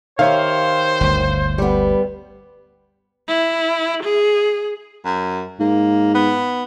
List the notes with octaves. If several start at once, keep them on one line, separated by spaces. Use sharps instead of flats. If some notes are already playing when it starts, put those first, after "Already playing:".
D#3 G4 C5 C#5 E5 F5
G1 D2
G3 B3
E4
G#4
F#2
G#2 A#3
B3